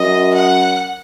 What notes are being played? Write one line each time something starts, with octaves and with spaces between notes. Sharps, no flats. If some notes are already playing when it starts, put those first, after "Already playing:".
Already playing: F#2 D#5
F#5